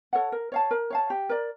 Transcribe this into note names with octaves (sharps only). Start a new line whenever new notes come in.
A4 C#5 F#5
A#4
C#5 F5 A5
A#4
C#5 F5 A5
G4
A#4 D5